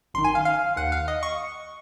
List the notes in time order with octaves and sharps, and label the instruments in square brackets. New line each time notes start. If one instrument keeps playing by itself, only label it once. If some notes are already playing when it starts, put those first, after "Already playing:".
[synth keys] G#1 F#2 D#3 C6
G#5
F5
F5
D#2 D#3 F#5
F5
D#5
C#6